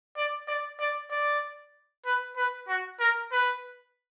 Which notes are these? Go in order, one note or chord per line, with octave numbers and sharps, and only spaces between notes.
D5
D5
D5
D5
B4
B4
F#4
A#4
B4